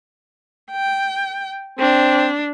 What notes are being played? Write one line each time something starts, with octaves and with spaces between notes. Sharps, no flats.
G5
C4 D4